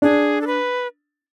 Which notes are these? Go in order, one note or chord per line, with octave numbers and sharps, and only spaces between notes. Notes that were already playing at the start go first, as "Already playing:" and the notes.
D4 G#4
A4
B4